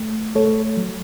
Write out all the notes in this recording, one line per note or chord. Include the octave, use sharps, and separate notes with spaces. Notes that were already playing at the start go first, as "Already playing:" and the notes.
Already playing: A3
A3 A4 C#5
F#3